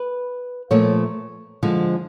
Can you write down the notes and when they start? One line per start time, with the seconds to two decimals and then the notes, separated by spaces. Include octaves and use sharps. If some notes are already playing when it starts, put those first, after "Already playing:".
Already playing: B4
0.71 A#2 F3 A3 C#5
1.63 D3 F3 G#3